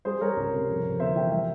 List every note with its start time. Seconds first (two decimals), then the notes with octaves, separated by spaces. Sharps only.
0.05 G3 G#4 C5
0.21 G3 A#4 C#5
0.37 C#2
0.53 C3
0.69 F2
0.84 F2
0.99 G1 C5 E5
1.15 E3 E5 G5
1.31 G3 E5 G5